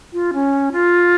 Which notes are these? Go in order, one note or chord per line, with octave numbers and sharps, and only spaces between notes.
F4
C#4
F4